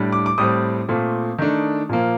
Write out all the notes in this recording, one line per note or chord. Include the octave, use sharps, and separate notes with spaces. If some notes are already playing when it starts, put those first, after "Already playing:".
Already playing: A2 G3 D4
D6
D6
A2 G3 C4 D#6
A#2 A3 C4
D#3 A3 D4
A#2 F3 A#3